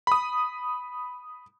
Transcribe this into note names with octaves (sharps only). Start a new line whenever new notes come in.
B5 D#6